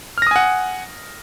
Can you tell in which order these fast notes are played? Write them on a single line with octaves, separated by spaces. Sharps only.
F6 A#6 D#6 G#5 F#5